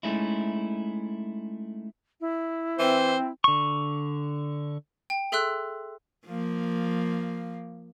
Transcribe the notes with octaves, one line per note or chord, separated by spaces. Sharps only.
G#3 A3 C#4 D#4 E4
E4
E3 C4 C5
D3 C#6
G5
G#4 A4 E5 C6 E6 F#6
F3 A#3